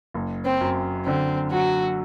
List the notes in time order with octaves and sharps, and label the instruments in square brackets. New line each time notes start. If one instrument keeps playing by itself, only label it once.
[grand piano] F#1
[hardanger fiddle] C4
[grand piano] F#2
[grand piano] D3 [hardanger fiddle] C4
[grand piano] F#3 [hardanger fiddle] F#4